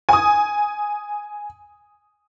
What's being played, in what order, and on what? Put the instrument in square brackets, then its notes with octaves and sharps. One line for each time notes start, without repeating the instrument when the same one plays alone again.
[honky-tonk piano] G#5 D#6